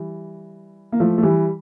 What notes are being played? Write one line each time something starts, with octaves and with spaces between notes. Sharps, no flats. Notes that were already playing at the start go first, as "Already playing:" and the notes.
Already playing: E3 G3
A#3
F3 A3
A3
E3 G3